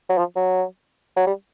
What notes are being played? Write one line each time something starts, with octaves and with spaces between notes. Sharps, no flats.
F#3
F3
F#3
F#3
G3